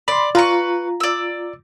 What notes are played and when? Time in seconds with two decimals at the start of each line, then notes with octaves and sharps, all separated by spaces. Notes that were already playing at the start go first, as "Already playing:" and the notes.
0.08 D5 B5 C6
0.35 F4 B4 A#5 C#6
1.00 D5 E6